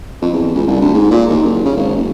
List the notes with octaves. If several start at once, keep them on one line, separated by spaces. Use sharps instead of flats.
F2
E2
C#2
C2
D2
G#2
A#2
D#2
F#1
C#3
G#1
F#1